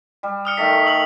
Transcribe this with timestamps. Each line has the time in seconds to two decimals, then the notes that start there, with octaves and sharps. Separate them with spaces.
0.23 G3
0.45 D#6 F6 C#7
0.57 D#3 A3 A4 B6
0.73 D#6 B6
0.87 E6 F#7